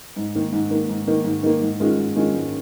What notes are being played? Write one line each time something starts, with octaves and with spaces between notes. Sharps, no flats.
G#2
D#3 A#3
G#2
D#3 A#3
G#2
D#3 A#3
G#2
D#3 A#3
G#2
D#3 G#3 C#4 F4
G#2
D#3 G#3 C#4 F4
G#2